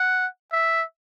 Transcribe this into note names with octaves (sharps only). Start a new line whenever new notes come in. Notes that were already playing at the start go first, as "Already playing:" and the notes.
Already playing: F#5
E5